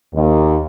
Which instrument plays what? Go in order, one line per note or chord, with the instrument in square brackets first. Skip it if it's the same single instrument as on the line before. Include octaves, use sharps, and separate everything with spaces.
[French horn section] D#2